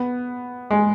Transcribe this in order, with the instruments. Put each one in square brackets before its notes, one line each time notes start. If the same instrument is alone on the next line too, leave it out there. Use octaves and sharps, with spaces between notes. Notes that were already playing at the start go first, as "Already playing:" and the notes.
Already playing: [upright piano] B3
G#3